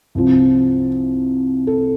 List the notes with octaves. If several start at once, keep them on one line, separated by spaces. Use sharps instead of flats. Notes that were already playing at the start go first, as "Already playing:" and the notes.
C2 C3 F3
A4